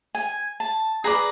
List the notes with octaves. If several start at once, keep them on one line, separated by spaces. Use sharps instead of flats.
G#5
A5
G#4 B4 D5 A#5